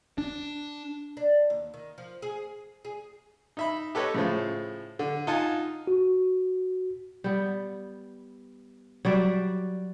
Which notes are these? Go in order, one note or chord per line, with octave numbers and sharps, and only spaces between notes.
D4
D4
D#2
D#3
F3
G#4
G#4
D#4 E5 B5
G4 A4 B4 C#5 D#5
A2 C#3 F3
D3
D#4 F4 F#5 G#5 A5
F#4
G3 B3
F#3 G3 D5 E5